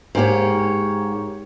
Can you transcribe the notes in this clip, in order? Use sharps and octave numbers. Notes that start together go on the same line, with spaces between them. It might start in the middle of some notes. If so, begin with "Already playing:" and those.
G#2 A#3 G4 C#5